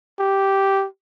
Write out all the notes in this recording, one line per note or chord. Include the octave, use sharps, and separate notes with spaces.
G4